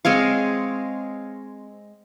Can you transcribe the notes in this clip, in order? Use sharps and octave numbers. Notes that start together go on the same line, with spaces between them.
G#3 C4 C#5 F5